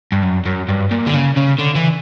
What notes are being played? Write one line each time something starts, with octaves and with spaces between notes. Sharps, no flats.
G2
F#2
F#2
G2
A#2
D3
C#3
C#3
D3
E3